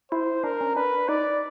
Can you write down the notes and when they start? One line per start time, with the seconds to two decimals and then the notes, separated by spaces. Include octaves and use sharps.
0.11 E4 C5
0.44 D4 A#4
0.61 C#4
0.76 D4 B4
1.09 D#4 D5